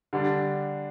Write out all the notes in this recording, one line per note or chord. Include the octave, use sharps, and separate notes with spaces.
D3 G3 D4